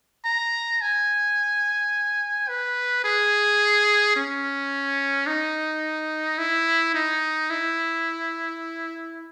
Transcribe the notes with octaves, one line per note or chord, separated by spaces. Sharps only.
A#5
G#5
B4
G#4
C#4
D#4
E4
D#4
E4